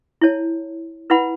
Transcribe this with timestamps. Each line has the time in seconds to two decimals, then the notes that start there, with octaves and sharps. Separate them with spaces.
0.21 E4 C#5 A5
1.10 E4 B4 F#5 B5